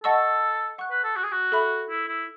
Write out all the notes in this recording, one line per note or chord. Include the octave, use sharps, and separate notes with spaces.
A4 D#5 F#5 A5 C#6 E6
F#5 C#6 F#6
B4
A4
F#4
G#4
F#4
A4 E5 B5 F#6
E4
E4